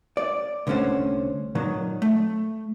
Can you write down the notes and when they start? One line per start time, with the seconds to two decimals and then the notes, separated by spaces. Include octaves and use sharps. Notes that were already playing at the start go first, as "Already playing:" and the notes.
0.17 D5
0.67 C2 D3 A3 C#4 C5 F#5
1.55 A#2 D#3 F#3
2.02 A3